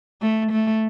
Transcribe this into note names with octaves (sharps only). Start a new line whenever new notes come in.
A3
A3